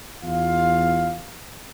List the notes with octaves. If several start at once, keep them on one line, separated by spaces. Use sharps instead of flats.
E2 F4 F5